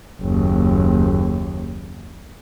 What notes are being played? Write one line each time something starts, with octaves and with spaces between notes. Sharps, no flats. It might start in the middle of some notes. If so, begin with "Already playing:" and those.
F#1 D#2